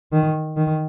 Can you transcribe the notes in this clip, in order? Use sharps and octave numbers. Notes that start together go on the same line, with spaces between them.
D#3
D#3